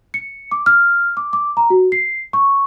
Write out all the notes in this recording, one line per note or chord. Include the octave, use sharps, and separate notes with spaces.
C#7
D6
F6
D6
D6
A#5
F#4
C7
C#6